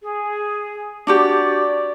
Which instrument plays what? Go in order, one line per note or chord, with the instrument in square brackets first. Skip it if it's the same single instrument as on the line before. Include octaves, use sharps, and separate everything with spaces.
[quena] G#4
[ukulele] D4 F#4 G4 [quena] D5